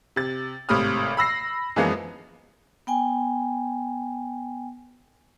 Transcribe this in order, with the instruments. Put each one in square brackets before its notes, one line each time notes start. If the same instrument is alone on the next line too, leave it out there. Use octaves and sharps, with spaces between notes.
[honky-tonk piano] C3 A6
G#1 A2 C3 B5 D#6 F6
B5 E6 A#6 C7
F#2 E3 F3 G#3 A#3 B3
[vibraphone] B3 G5 G#5